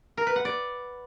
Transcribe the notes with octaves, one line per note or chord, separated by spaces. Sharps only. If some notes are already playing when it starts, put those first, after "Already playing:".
A#4
B4
F#5
D5